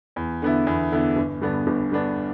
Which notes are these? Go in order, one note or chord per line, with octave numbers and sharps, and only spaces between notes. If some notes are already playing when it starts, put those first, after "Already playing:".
E2
D3 B3 E4
E2
D3 B3 E4
G1
G2 D3 B3 D4
G1
G2 D3 B3 D4